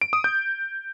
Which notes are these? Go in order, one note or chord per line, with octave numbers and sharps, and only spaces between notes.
D7
D#6
G6